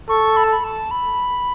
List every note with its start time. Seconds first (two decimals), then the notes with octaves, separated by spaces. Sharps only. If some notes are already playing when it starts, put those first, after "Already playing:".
0.09 A4 C#6
0.37 B5
0.44 A5
0.52 B5
0.64 A5
0.91 B5